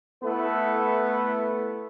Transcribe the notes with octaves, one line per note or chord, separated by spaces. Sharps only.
A3 B3 E4 A4 B4